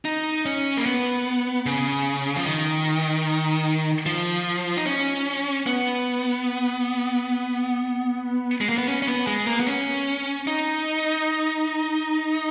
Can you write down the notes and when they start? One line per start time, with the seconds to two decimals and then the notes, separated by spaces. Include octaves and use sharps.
0.05 D#4
0.46 C#4
0.77 A#3
0.86 B3
1.66 C#3
2.36 F3
2.46 D#3
4.06 F3
4.77 D#4
4.87 C#4
5.66 B3
8.61 G#3
8.69 A#3
8.78 B3
8.87 C#4
9.02 C#4
9.07 B3
9.27 G#3
9.47 A#3
9.60 B3
9.67 C#4
10.47 D#4